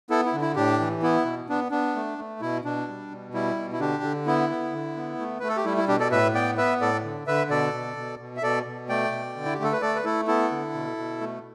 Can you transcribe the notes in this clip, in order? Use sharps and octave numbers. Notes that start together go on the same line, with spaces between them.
B3 E4 A4
E4
D3
E4
A2 D4 G4
E3
B3 E4
B2
B3 D4
B3 D4
A3
A3
B2 E4
B2 D4
G3
B2
G3 E4
B2
E4
D3 D4 G4
D3
B3 E4
B3
D3
B3
A3
A3 B4
A4
G4
G3 E4
E4
B2 D4 G4
A4 D5
A2 B4 E5
B3 D5 G5
B3 B4 E5
A2 A4 D5
D3
D3 B4 E5
B2 A4 D5
B2
B2
B2
E5
B2 A4 D5
B2
A3 D5 G5
B2
D3
E4
G4
A3
A4
B4
A3 A4 D5
B4
A3 E4 A4
B3 E4 A4
D3
B2
B2
A3